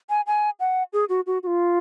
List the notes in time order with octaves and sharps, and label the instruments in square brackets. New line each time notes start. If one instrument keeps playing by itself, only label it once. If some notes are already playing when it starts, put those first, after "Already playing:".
[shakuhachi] G#5
G#5
F#5
G#4
F#4
F#4
F#4
F4